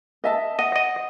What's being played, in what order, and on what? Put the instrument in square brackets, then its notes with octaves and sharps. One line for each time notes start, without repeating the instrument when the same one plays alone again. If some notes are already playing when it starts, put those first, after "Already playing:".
[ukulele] D#5 E5 A5
[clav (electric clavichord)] D#5 [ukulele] F#5
[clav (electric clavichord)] D#5